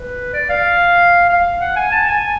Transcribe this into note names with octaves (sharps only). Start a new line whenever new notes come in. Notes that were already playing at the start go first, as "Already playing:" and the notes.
Already playing: B4
D5
F5
F5
F#5
G#5
A5
G#5